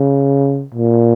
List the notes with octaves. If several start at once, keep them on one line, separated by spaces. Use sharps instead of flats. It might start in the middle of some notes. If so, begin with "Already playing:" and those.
Already playing: C#3
A#2